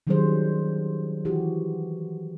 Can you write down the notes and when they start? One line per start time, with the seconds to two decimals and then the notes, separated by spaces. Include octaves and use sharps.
0.07 D#3 F#3 G3 C#4 G#4 C5
1.25 E3 F#4 G4